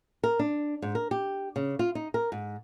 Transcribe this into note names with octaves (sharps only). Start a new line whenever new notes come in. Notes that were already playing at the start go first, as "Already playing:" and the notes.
A#4
D4
G#2
A#4
G4
C#3
F4
D#4
A#4
G#2